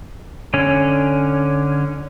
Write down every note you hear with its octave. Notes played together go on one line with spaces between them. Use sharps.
D3 C#4